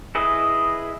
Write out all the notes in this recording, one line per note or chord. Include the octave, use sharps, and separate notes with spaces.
E4 G#4 B4 D#5